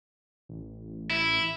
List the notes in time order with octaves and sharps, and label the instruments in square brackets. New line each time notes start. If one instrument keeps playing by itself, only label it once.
[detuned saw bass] A1
[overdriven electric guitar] E4